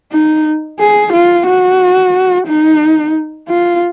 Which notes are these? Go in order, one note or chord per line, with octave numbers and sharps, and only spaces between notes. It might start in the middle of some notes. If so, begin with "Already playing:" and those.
D#4
G#4
F4
F#4
D#4
F4